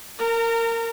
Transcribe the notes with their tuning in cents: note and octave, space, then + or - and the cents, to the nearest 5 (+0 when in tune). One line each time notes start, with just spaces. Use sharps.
A#4 -20 A#5 -35